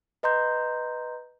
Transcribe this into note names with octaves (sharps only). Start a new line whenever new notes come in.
B4 D#5 A#5 C6 G6